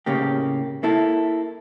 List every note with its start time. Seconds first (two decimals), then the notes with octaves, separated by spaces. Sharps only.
0.06 A2 C#3 A#3 G4
0.83 A#3 E4 A4